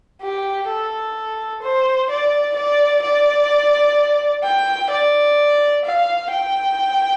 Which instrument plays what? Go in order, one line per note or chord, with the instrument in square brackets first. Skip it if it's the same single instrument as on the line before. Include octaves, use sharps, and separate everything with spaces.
[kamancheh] G4
A4
C5
D5
D5
D5
G5
D5
F5
G5